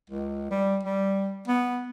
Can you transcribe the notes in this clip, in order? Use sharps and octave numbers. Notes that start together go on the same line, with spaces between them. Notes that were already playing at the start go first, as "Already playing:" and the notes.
C#2
G3
G3
B3